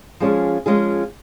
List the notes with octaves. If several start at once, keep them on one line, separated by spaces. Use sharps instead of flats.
F3 G#3 C#4 F4 G#4
F3 G#3 C#4 F4 G#4